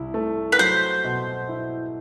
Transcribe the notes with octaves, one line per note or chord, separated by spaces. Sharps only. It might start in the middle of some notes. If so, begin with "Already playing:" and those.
Already playing: C2 E4
A3
B4
F#3 C5
B2
E4